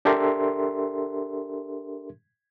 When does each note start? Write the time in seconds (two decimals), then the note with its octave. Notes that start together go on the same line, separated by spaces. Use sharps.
0.05 D4 G4 A4 A#4 E5 C6